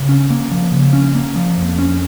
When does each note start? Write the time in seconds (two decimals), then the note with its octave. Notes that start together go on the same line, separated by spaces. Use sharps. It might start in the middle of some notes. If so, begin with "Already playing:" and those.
Already playing: C#3
0.09 C#4
0.30 A#3
0.51 F3
0.72 C#3
0.93 C#4
1.15 A#3
1.36 F3
1.57 F2
1.79 C#4